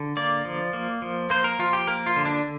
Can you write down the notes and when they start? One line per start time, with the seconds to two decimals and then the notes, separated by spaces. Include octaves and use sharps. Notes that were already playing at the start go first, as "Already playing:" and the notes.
Already playing: D3
0.17 A#3 D5
0.45 F3
0.73 A#3
1.02 F3
1.30 A#3 C5
1.44 A#4
1.59 F3 F4
1.73 G4
1.87 A#3 A#4
2.06 F4
2.16 D3
2.25 D4